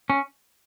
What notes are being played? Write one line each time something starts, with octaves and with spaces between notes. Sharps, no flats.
C#4